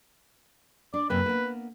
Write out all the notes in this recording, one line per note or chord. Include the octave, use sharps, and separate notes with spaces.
D4 D5
F#2 C3 A#3 B4
A#3 B3